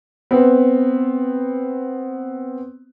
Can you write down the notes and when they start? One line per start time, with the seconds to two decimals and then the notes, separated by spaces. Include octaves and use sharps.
0.31 B3 C4